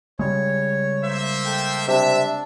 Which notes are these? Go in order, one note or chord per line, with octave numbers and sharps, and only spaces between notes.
C#3 G3 G#3 C#5
A#3 C5 E5
A4 G5
C3 D4 E5